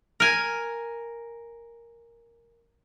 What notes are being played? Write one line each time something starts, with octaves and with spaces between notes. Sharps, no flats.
A#4 G#5